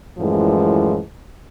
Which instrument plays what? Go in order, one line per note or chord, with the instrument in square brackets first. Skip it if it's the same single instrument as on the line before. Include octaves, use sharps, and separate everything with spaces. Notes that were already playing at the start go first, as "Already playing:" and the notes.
[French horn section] F#2 A2 E3 F3 G#3